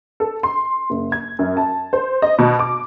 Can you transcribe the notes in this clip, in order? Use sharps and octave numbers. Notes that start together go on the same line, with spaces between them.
A4
C6
F#1
G#6
F#2
A5
C5
D#5
B2
D6